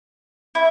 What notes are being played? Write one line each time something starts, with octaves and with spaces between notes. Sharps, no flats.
E4